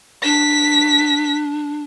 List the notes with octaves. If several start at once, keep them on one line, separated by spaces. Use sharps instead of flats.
D4 B6